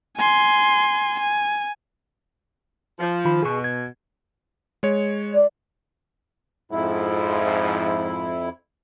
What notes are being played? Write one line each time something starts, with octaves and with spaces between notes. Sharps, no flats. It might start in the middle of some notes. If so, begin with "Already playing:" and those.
G#5 C6
G#5
F3
D#3 F4 B5
B2 G#4 C#6
G#6
G#3 C#5
D5
F2 G#2 F3 E4